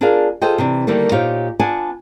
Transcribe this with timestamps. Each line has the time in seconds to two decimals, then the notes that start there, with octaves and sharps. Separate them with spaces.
0.01 D4 F4 G#4 A#4 D5 F5
0.42 F4 G#4 A4 C5 D#5 G5
0.58 C3 E3 D4
0.87 D3 D#3 G3 A3 A#3
1.12 A#2 D#4 G4 C5 C#5 F5
1.59 B3 D4 F4 F#5 G#5 A5